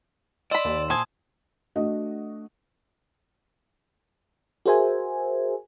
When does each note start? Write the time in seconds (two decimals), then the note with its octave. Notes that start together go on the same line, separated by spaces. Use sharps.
0.51 D5 D#5 B5 C6 E6 E7
0.65 D#2
0.90 A#2 C5 G#5 A5 D#6 G#6
1.75 A3 D4 F#4 D#5
4.66 F#4 G#4 A#4 C5 E5 G#5